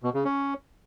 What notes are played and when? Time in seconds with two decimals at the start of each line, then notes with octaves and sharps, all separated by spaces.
0.03 B2
0.14 C#3
0.25 C#4